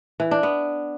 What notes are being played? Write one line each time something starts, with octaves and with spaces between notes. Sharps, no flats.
E3
D4
B3